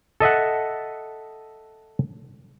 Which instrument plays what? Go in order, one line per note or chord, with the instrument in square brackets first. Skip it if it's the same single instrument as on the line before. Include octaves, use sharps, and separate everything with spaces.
[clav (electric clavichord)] A4 D#5 E5 F#5